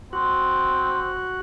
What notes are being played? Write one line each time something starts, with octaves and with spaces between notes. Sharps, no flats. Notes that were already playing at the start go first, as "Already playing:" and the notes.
C4 F#4